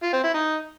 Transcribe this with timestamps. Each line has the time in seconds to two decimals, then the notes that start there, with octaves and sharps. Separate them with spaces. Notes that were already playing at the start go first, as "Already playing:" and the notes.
0.03 F4
0.13 C4
0.24 E4
0.34 D#4